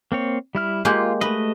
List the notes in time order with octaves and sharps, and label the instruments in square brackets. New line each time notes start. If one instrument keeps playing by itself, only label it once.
[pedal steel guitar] A#3 C4 C#5
G3 E4 F6
[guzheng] G#3 A#3 G4 [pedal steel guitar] F4
[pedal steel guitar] A3 D#5 [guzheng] B4